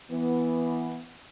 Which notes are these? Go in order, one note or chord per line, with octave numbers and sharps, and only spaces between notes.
E3 B3